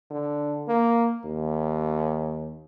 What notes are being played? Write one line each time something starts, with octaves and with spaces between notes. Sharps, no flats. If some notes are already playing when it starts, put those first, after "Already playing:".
D3
A#3
D#2